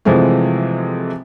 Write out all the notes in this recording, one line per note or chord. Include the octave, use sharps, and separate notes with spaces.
C3 E3 F3 G#3 A3 C4